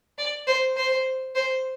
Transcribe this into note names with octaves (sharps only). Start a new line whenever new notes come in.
D5
C5
C5
C5